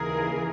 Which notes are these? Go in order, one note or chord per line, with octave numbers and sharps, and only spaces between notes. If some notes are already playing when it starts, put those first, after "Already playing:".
Already playing: D#2 C#3 E3 G#4 A#4